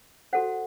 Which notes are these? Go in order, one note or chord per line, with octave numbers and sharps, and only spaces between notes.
F#4 A4 C5 F#5